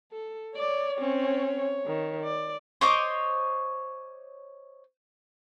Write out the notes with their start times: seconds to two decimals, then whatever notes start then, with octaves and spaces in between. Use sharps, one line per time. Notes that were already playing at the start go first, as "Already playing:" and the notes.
0.12 A4
0.56 C#5 D5
0.99 C4 C#4
1.86 D#3
2.24 D5
2.81 C5 C#5 D#5 D6